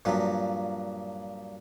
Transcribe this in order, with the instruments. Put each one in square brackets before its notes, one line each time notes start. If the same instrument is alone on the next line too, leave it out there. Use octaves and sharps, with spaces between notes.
[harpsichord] G2 A#2 F3 F#3